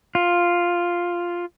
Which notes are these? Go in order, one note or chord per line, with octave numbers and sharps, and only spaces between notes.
F4